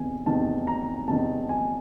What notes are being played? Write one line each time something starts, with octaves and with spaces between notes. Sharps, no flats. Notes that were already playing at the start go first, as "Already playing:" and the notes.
Already playing: E2 C3 D#3 G#5
E2 C3 D#3 A5
A#5
E2 C3 D#3 A5
G#5